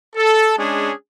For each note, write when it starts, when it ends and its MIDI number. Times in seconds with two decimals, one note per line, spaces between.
0.16 0.57 69
0.57 0.92 56
0.57 0.92 61
0.57 0.92 62
0.57 0.92 68